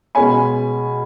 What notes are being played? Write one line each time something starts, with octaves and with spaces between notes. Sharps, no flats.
B2 G#3 C#4 G#5 B5